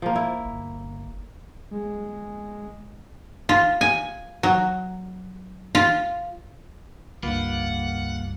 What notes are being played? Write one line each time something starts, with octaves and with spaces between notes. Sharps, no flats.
F3 A#3
E4
G1
G#3
F4
G#5
F#3
F4
C#2 G2 A#3 F4 B4 F#5